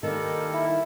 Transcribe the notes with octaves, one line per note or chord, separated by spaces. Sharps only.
D#3 G3 A#3 A4
E4